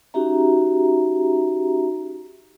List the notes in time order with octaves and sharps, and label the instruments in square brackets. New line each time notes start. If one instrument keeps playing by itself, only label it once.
[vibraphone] C#4 D#4 F#4 G4 E5 A#5